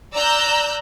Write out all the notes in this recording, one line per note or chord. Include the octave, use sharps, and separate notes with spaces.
D5 A#5 E6 F#6 G6